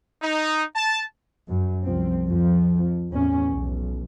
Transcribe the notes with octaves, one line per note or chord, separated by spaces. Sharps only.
D#4
A5
F#2
C2 F3 C4
F2 F3
E2 A2 C#4
B1